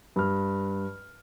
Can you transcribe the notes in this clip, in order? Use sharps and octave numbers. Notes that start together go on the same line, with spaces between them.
G2 F6